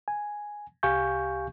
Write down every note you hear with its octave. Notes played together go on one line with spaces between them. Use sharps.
G#5
C2 G4 F5 G#5 C#6 G6